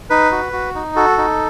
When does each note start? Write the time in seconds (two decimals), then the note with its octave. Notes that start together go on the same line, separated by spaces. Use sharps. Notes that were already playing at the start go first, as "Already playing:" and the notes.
0.10 D#4 B4
0.32 F#4
0.53 F#4
0.75 D#4
0.96 F#4 A4
1.18 D#4